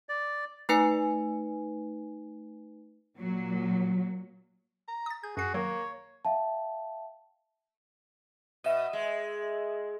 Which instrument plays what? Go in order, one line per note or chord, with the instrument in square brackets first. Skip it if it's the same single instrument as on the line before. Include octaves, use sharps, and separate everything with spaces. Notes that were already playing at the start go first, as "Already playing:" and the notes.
[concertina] D5
[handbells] A3 D#4 B4 G#5 C#7
[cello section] A#2 F#3
[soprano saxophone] A#5
[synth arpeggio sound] D#6 A6
[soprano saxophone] G#4 [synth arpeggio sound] G6
[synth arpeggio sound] F#2 C7 [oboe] F#4 [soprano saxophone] G#4
[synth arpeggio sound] D#3 F#3 [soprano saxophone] A#3 [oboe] C#5
[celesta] E5 F5 G5 A5
[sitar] B2 [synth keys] D#5 E5
[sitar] G#3